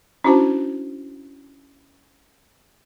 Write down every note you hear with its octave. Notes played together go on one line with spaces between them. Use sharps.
C#4 D4 E4 F#4 C5 A5